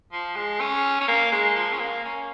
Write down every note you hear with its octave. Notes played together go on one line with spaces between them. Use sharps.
F3
G#3
C#4
C#4
A#3
G#3
F3
C#4
A#3
C#4